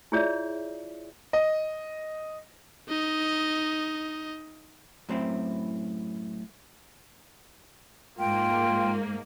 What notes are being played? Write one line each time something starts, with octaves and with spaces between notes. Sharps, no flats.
E4 F4 G#4 C#5 D5 E5
D#5
D#4 D#5
F#2 A2 C4 E4
G#2 A#3 F4 G5